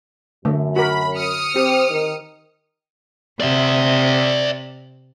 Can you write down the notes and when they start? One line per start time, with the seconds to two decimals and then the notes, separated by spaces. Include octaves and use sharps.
0.45 F#2 D3 A3
0.76 F#4 A#4 B5
1.16 D#6 F6 C#7
1.56 C4 G4
1.90 D#3
3.41 C3 D5 E5